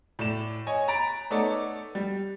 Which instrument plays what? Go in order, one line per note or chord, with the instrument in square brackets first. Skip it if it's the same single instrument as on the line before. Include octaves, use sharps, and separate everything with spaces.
[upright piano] A2 D5 E7
C#5 D#5 G#5
A#5 B5 A6 D7
A3 B3 D#4 A4 C#5 D5
G3